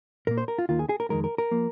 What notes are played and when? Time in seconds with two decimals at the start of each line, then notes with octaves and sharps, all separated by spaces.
0.27 A#2 A#3 A#4
0.38 C5
0.48 A#4
0.58 F4
0.69 D#2 D#3 A#3 F4
0.79 G#4
0.89 G#4
1.00 A#4
1.10 F2 D#3 G#3 A#4
1.24 A#4
1.38 A#4
1.51 F3 A#3